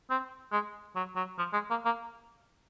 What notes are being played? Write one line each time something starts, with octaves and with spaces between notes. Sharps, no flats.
C4
G#3
F#3
F#3
F3
G#3
A#3
A#3